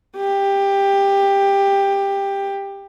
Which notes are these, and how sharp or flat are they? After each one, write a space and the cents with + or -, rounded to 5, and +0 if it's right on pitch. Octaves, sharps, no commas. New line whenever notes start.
G4 +15